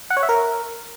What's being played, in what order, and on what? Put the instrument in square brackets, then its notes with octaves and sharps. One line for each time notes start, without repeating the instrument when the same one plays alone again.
[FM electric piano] F#5
C#5
E5
A#4